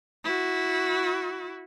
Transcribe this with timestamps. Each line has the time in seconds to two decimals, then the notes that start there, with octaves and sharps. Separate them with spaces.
0.24 E4 F#4